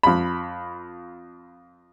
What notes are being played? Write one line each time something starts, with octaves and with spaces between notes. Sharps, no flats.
F2 B5